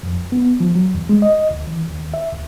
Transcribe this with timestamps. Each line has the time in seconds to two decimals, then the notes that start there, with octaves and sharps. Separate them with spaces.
0.03 F2
0.32 B3
0.60 F3
0.75 F#3
0.95 E2
1.09 G#3
1.22 D#5
1.51 D2
1.67 E3
1.88 D#2
2.14 E5
2.33 D2